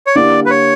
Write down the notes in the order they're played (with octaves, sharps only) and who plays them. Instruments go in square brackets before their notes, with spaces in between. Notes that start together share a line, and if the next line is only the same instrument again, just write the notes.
[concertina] C#5
[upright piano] D3 A#3 E4 G4 [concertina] D5
[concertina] B4
C#5